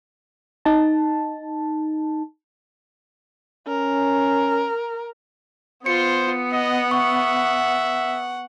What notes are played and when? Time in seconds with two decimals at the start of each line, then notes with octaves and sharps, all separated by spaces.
0.65 D#4 A5
3.68 C#4 A#4
5.86 B3 F4 C5 C#7
6.53 D#5 F#5
6.91 E5 C#6